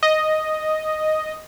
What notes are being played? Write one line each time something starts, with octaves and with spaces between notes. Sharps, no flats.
D#5